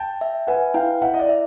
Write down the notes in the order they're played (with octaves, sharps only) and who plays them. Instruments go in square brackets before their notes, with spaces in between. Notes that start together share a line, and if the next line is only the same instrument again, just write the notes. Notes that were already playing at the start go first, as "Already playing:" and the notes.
Already playing: [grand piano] G5 A5
[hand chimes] E5
[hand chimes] B4 [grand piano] F#5 G#5
[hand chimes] E4 [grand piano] F5 G5
[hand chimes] E4 [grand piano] E5 F#5
[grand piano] D#5
D5
[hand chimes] E5